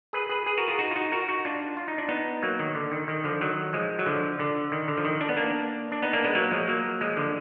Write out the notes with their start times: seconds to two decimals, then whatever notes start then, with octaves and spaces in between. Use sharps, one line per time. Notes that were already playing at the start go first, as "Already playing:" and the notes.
0.13 G#4 B4
0.29 G#4 B4
0.46 G#4 B4
0.58 F#4 A#4
0.68 F4 G#4
0.79 D#4 F#4
0.91 F4
0.96 D#4 F#4
1.12 F#4 A#4
1.28 D#4 F#4
1.45 D4 F4
1.77 F4
1.88 D#4
1.98 D4
2.09 B3 D#4
2.43 F#3 A#3
2.59 D#3
2.75 D3
2.92 D#3
3.08 D#3
3.24 D3 F3
3.41 D#3 F#3
3.73 F3 G#3
3.99 F#3
4.06 D3 F3
4.39 D3
4.72 D#3
4.88 D3
4.97 F3
5.05 D#3
5.21 D4
5.29 B3
5.37 A#3 D4
5.92 D4
6.02 B3 D#4
6.13 A#3 D4
6.24 G#3 B3
6.35 F#3 A#3
6.51 F3 G#3
6.68 F#3 A#3
7.01 F3 G#3
7.17 D3 F3